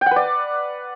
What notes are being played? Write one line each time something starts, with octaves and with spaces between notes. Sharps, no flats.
G5
F#5
B4
D5